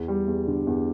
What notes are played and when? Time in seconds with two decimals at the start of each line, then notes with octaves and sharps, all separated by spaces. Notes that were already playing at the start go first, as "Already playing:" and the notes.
Already playing: E2
0.08 G3
0.28 E2
0.47 D3
0.67 E2